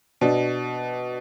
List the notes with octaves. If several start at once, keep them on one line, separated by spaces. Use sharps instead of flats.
B2 D4